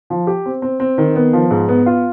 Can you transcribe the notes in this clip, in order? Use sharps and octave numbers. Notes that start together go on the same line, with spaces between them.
F3
G4
C4
C4
C4
D#3
B3
F3
G#2
B3
F4